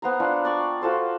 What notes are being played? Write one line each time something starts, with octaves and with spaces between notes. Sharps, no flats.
B3 C5 A#5
D4 F4 F#5
D5 G5 C#6
F4 F#4 A4 C5